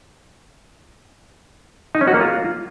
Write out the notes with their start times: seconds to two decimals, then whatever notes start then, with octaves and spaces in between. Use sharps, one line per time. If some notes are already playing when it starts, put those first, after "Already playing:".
1.95 D#4
2.01 C#4
2.08 F#4
2.14 A#3
2.20 F4